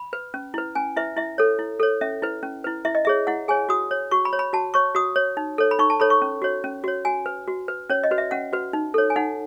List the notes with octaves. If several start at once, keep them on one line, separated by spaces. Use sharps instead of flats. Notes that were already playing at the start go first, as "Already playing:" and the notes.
Already playing: B5
B4
C#4
E4 B4
C#4 G#5
E4 B4 E5
E4 E5
A4 C#5
E4
A4 C#5
C#4 E5
E4 B4
C#4
E4 B4
E4 E5
D#5
G#4 C#5 E5
E4 F#5
G#4 C#5 G#5
F#4 D#6
C#5
F#4 C#6
B5
C#5
B5
F#4 A5
C#5 C#6
F#4 D#6
C#5
D#4
A4 C#5
B5
D#4 C#6
A5
A4 C#5 B5
C#6
C#4
F#4 C#5
C#4
F#4 C#5
F#4 G#5
B4
F#4
B4
C#4 C#5
D#5
F#4 B4
E5
C#4 F#5
F#4 B4
D#4
A4 C#5
G#5
D#4 F#5